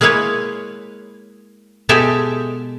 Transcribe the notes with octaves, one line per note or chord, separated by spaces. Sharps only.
G#3 A#3 E4 B4 C#5
B2 G#3 G4 A4 E5 G#5